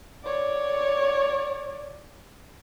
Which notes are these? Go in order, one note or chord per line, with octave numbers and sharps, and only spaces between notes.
C#5 D5